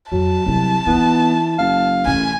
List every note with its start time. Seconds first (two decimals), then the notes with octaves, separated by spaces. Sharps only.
0.12 F2 F#3 A5
0.46 C2 C3 F#3
0.87 E3 B3 C4 D#4
1.59 F#1 F5
2.06 A1 B2 C#4 G#5